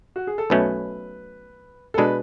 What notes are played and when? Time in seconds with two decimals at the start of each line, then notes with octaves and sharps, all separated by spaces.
0.16 F#4
0.27 G#4
0.38 A4
0.50 B1 B2 A3 C#4 B4
1.94 A4
1.98 B2 G#3 D4 B4